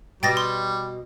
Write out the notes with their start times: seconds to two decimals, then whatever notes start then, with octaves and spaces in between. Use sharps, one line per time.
0.23 B2 G3 G5 A6 A#6
0.37 C6